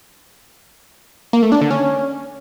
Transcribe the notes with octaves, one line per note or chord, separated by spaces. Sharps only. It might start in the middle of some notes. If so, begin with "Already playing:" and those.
A#3
A3
D4
D3
C#4